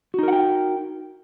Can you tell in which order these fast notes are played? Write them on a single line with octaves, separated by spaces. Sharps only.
F#4 D#4 A#4 F#5 G5